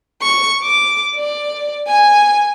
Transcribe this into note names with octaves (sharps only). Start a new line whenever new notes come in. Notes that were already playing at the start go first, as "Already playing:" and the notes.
C#6
D6
D5
G#5